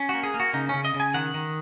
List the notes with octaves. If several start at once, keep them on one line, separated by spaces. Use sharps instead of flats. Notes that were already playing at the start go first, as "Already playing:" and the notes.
Already playing: C#4
A#3 F#4
G#4
A#3
F#4
C#3 D#4
C#3 C#4
D#5
C#3
G#5
D#3 F#5
D#3